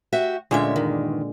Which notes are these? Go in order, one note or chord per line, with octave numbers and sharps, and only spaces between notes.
F#4 G4 E5
D2 A#2 D3 G#3 C#4 E5
E2 G2 D#3